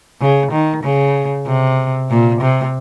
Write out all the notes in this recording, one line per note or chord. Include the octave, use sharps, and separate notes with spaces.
C#3
D#3
C#3
C3
A#2
C3